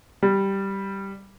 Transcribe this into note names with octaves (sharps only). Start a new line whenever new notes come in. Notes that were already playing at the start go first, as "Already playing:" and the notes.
G3